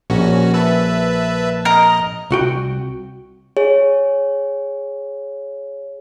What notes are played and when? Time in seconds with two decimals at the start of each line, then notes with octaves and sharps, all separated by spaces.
0.10 A#1 C#4 F#4
0.54 B4 E5 A5
1.65 A#4 D#5
2.30 C2 F#4 G5
3.57 G#4 C#5